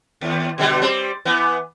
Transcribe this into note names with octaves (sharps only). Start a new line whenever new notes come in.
D#2
B2 D3 G3
G3 C4
E3 B3